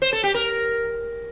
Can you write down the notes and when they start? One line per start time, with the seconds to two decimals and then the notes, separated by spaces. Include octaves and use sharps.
0.02 C5
0.13 A4
0.24 G4
0.34 A#4